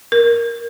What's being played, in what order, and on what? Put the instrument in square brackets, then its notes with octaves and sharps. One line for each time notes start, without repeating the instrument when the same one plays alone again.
[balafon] A#4